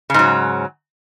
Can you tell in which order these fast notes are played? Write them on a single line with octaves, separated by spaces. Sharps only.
C#3 G#2 F#3